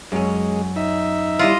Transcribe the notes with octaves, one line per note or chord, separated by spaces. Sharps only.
F#2 G#3 C#4
D#4 E5
G3 E4 F4 D#5